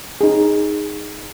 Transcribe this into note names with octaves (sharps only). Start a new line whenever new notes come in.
D#4 G#4